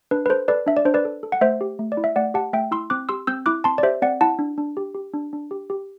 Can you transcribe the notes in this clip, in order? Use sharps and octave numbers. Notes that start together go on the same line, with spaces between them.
D4 B4
B4
A4 C5
A4 B4 D5
D4 E5
D5
D4 C5
B4 D5
A4
A4
F#5
A3 C5 E5
G4
A3
D5
E4
E5
A3 D5 F#5
G4 F#5 A5
A3 E5 G5
E4 C6 E6
C4 D6 F#6
G4 C6 E6
C4 E6 G6
E4 D6 F#6
C4 A5 C6
D5
G4 C5 E5
C4 D5 F#5
E4 F#5 A5
D4
D4
G4
G4
D4
D4
G4
G4